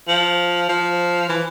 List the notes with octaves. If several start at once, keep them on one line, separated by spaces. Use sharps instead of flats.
F3
F3
E3